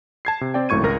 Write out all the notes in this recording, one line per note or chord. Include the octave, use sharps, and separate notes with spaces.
A5 G#6 C7
C3
C4 D5 G5
G#1 F#2 A2 C#6 G#6 D#7
C#2 A#4 A#6